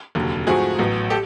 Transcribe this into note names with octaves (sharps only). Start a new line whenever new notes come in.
F1 D#2 D3 F#3
G#2 F3 A3 C4 F#4 G#4
A1 A2 F#3 B3
G4 A4